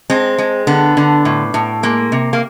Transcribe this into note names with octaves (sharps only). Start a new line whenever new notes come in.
G#3 C4
G#3
D3 B3
D3
A2
A2
G#3 A#3
C3
A#3